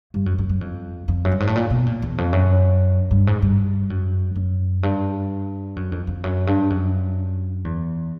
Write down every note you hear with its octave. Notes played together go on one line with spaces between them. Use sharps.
G2
F#2
F#2
F#2
F2
F2
F#2
G2
G#2
A2
A#2
B2
A#2
E2
F2
F#2
G2
G#2
G2
F#2
F#2
G2
F#2
F2
F2
F#2
G2
F#2
E2